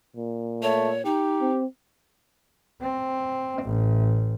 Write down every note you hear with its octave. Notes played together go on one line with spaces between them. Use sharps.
A#2
A3 C#5
D#4 G4
C4
C4
A1